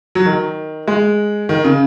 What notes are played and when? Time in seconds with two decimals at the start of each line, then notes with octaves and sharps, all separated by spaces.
0.15 F#3
0.26 D#3
0.88 G#3
1.49 D#3
1.64 C#3